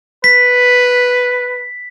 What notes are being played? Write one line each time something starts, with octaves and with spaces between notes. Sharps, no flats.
B4 B6